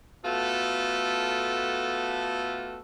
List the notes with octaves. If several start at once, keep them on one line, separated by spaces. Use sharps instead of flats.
A3 B3 F4 F#4 A4